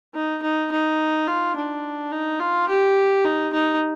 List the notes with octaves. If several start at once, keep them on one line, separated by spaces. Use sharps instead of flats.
D#4
D#4
D#4
F4
D4
D#4
F4
G4
D#4
D#4